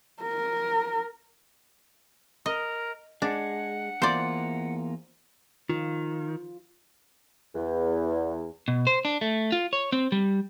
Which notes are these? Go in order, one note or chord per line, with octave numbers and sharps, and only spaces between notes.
A#4
A#4 D#5
G#3 D4 F#5
E2 A#3 F4 C5 D5
D#3 F4
E2
B2
C5
D4
A3
F4
C#5
C4
G3